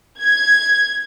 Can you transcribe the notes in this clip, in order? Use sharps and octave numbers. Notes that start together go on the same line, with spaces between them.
G#6